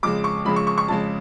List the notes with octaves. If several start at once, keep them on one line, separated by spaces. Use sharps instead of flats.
F2 C#3 G#3 D6
C#6
F2 C#3 G#3 B5
C#6
C#6
C#6
F2 C#3 G#3 A5